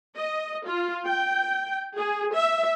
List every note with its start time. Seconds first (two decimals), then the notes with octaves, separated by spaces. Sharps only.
0.16 D#5
0.66 F4
1.08 G5
1.97 G#4
2.32 E5